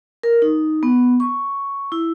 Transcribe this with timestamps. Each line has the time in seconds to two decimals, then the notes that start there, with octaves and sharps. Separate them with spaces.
0.23 A#4
0.42 D#4
0.83 B3
1.20 C#6
1.92 E4